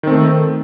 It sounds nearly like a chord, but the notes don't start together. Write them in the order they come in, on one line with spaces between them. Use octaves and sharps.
D#3 C4 A3